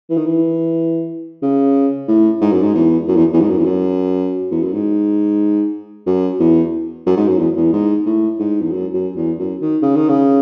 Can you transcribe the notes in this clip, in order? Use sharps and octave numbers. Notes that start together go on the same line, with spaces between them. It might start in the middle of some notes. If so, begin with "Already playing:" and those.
E3
D#3
E3
C#3
A2
G#2
F#2
G#2
E2
F#2
E2
E2
G#2
F#2
E2
F#2
E2
F#2
G#2
F#2
E2
F#2
G#2
F#2
E2
E2
G#2
A2
G#2
E2
F#2
F#2
E2
F#2
D#3
C#3
D#3
C#3